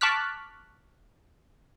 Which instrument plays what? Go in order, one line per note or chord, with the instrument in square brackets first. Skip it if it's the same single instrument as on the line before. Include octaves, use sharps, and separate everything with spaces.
[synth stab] A5 C#6 D6 F6 F#6 B6